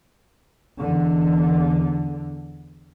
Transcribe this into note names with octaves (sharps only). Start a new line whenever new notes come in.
E2 D3